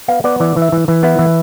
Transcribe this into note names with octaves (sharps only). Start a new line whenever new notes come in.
B3 F5
B3 D5
E3 D5
E3
E5
E3
E3
B3 E4
E3